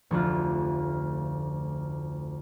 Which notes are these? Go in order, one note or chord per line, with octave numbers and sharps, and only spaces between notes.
F1 D2 D4 F4